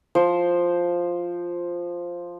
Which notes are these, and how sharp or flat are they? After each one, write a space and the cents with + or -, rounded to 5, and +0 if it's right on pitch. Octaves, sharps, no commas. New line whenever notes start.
F3 +0 C5 +5